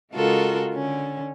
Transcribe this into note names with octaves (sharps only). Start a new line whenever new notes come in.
C#3 G#3 F4 F#4 A4 A#4
D3 C#4